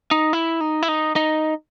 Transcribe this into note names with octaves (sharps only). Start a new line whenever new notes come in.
D#4
E4
D#4
E4
D#4
D#4